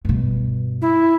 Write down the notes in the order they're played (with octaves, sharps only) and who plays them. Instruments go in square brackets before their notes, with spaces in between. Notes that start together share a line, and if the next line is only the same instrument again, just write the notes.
[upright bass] G2 B2
[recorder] E4